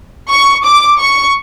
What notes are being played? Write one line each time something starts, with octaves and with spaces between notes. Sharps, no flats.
C#6
D6
C#6